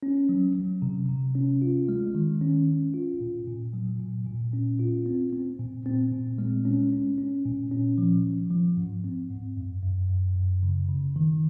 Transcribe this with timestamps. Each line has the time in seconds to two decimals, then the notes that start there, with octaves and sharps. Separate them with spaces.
0.03 C#4
0.29 F#3
0.55 F#3
0.82 C3
1.09 C3
1.35 C#4
1.62 F4
1.89 G#3
2.15 D#3
2.41 C#4
2.68 C#4
2.94 F4
3.21 A#2
3.48 A#2
3.74 F#3
4.00 A#2
4.27 A#2
4.53 C#4
4.79 F4
5.06 C4
5.33 C4
5.59 A#2
5.86 C4
6.12 A#2
6.38 G#3
6.65 C#4
6.92 C#4
7.18 C#4
7.45 A#2
7.71 C#4
7.98 F3
8.24 F3
8.51 F3
8.77 G#2
9.04 C4
9.30 G#2
9.57 F#2
9.83 F#2
10.10 F#2
10.36 F#2
10.63 C#3
10.89 C#3
11.16 D#3